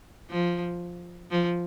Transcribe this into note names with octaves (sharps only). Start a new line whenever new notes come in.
F3
F3